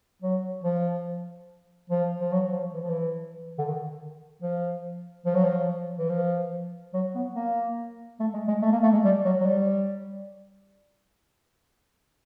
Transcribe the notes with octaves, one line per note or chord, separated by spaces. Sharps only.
F#3
F3
F3
F3
F#3
F3
E3
F3
E3
D3
D#3
F3
F3
F#3
F3
E3
F3
F#3
B3
A#3
A3
G#3
G#3
A3
A#3
A3
G#3
G3
F#3
F#3
G3